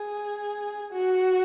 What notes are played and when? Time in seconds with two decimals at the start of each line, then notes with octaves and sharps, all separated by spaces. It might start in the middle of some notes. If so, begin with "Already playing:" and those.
Already playing: G#4
0.93 F#4